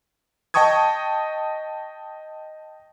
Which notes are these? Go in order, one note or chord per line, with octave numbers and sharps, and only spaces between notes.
D#5 G5 A5 C#6 D#6 G#6